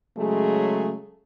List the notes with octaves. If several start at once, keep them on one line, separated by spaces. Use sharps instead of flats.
C#3 F#3 G#3 A3 G#4